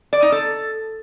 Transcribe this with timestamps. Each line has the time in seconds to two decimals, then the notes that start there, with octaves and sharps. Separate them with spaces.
0.13 D5
0.22 D#4
0.32 A4